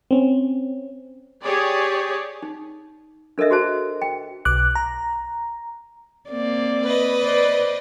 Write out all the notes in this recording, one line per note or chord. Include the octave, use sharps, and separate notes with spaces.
C4 C#4
G4 G#4 C#5 D5
D#4
D4 A4 A#4 D#5 E5
F#4 G#4 C5 A5
G5
B1 D6 F#6
A#5
A#3 C4 D5
B4 D#5
C5 D5